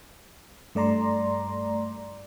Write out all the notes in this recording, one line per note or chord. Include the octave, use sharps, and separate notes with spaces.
G2 A3 D5 A#5 C6